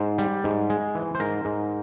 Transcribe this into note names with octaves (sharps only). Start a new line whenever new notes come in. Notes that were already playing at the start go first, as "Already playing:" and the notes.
Already playing: G#2 C5
G3
G#2
G#3
E3
C5
G#2 A#4
G#2